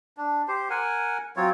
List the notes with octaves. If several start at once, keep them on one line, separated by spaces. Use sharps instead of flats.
D4
G4 C5
A#4 F#5 G#5
F#3 C4 F4 C#5